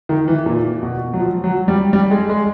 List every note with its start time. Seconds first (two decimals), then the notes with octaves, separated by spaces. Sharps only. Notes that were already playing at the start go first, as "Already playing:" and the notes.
0.09 D#3
0.28 E3
0.46 A#2
0.83 B2
1.13 F#3
1.19 F3
1.44 F#3
1.68 G3
1.93 G3
2.11 G#3
2.29 G#3